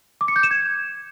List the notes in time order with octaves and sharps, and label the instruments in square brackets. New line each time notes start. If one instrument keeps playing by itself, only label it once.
[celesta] D6
C#7
G6
E7
G#6